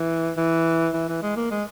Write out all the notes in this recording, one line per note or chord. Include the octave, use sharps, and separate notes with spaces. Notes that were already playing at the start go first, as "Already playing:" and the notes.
Already playing: E3
E3
E3
E3
G#3
A#3
G#3